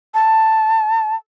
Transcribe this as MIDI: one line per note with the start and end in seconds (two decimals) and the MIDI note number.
0.14 1.15 81